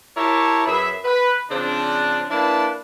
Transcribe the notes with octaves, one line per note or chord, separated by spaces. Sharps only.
E4 G4 A#4 C#5 A5
F#2 G#4 B4 E5
B4
C#3 F3 C4 D4
A#3 D4 E4 B4 A5